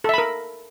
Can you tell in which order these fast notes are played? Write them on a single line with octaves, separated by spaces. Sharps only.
A4 E5 B5 A#4